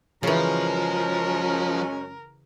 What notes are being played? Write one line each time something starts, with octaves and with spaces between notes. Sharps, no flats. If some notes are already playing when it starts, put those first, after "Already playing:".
F#2 C#3 E3 F3 G#3 C#4 A#4